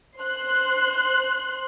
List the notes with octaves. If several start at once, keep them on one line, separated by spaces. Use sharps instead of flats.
C5 C6 F#6